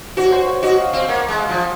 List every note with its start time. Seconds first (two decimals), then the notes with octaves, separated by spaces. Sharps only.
0.17 F#4 C5
0.24 C#5
0.32 C5
0.47 C#5
0.62 F#4 D#5
0.78 F5
0.93 C4 F5
1.08 A#3 F#5
1.28 G#3
1.39 F5
1.49 F3